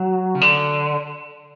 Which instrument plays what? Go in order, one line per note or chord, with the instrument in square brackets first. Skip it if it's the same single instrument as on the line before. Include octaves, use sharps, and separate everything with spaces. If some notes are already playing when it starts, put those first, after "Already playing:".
Already playing: [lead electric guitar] F#3
C#3
D3